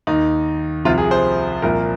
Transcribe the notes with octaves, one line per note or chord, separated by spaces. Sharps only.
D#2 D#3 D#4
C2 C3 F3 F4
G#4
C5
C2 A#2 F3 A#4